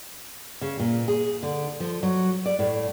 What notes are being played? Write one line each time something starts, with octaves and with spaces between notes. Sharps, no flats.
C#3
A#2
G#4
D3
F3
F#3
D5
A2